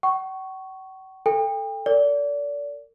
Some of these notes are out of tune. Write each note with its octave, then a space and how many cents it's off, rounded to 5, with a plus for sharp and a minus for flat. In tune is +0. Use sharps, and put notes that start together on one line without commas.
F#5 +45 C#6 +0
A4 +0 G5 +35
A#4 -30 D5 -30